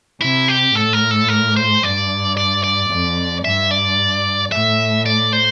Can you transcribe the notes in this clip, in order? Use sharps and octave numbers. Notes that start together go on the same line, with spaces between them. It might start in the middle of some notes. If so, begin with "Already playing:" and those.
C3 E4
G4
A2 A4
A#4
A4
A#4
C5
G2 D5
D5
D5
F2
G2 E5
D5
A2 E5
D5
C5